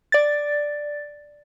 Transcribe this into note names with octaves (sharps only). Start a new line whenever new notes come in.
D5 A6